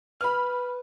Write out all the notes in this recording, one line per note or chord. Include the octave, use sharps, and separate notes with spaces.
B4 B5 F6